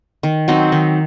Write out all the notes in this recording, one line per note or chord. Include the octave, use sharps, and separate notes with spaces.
D#3
F#3 C4 D#4
D#3